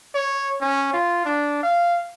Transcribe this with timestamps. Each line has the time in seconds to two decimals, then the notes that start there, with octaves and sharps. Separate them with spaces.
0.14 C#5
0.61 C#4
0.93 F4
1.25 D4
1.63 F5